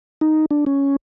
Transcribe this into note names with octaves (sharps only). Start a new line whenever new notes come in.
D#4
D4
C#4